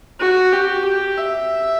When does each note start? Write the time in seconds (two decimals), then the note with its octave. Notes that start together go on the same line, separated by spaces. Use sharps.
0.20 F#4
0.52 G4
0.85 G4
1.18 E5